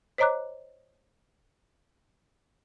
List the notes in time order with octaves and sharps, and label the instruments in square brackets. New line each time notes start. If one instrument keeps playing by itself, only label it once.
[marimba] C5 C#5 D#5 A#5 D6 F#6